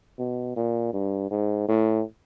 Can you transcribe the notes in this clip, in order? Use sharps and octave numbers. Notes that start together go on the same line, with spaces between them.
B2
A#2
G2
G#2
A2